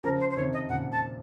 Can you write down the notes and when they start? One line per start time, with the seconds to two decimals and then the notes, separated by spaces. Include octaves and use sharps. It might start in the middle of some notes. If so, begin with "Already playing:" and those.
0.04 C#3 F3 A#4
0.20 C5
0.31 C5
0.37 C3 D#3 C#5
0.53 D#5
0.69 A#2 C#3 F#5
0.92 A5